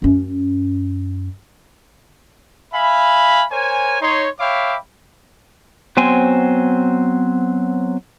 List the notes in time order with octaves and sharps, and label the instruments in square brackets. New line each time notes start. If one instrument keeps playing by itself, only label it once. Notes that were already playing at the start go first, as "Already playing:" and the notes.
[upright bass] F#2 C#4
[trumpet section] E5 F5 G#5 B5
A#4 C5 C#5 G#5
D#4 C#5 C6
C#5 E5 F5 G5 B5 D6
[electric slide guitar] F#3 B3 C4 C5 G5 G#5